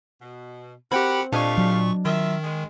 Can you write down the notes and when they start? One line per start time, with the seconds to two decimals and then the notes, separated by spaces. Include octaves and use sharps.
0.21 B2
0.92 C4 F#4 G4 A#4 F#5 G5 B5
1.33 A#2 A3 D4 G4 D#5 F5 G#5 C#6
1.58 F#3
2.05 D#3 F4 A#4 E5
2.43 G#3